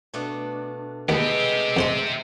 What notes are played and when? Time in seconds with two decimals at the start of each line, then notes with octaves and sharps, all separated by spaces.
0.14 B2 A3 D4
1.09 D#2 C3 G#3 B3 G4 A4
1.77 F2 C5 C6